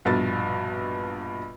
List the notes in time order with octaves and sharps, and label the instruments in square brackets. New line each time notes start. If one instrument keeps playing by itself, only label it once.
[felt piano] A#1 G2 B2 A6